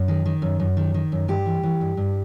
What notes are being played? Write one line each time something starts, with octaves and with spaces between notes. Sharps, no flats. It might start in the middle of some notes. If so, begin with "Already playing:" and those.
Already playing: F#2
D#3
D#3
F#2
F#2
D#3
D#3
F#2
G2 G4
E3
E3
G2
G2